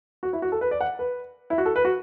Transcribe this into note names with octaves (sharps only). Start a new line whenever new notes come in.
F#4
E4
F#4
A4
B4
D5
F#5
B4
E4
F#4
A4
B4
F#4